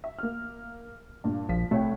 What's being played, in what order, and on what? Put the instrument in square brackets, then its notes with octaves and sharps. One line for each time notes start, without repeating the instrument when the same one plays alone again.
[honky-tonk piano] E5
A#3 F6
G2 A#2
[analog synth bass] A#1 [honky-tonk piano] F3 B6
[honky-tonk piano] C2 C#5 G5 [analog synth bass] A3